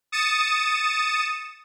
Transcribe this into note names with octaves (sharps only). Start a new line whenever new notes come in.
D#6 A6 C#7 E7